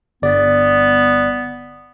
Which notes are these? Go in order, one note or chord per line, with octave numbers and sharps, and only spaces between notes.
G1 B3 D5